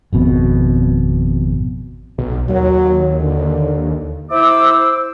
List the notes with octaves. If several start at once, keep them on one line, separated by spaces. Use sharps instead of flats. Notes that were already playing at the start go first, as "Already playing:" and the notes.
G#1 F2 B2
B1
D#2 F#3
D3
E4 C5 D6 E6